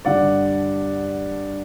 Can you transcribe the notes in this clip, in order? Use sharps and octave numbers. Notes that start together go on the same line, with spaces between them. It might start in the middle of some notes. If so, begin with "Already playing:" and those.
G2 D3 G3 D4 D5 F#5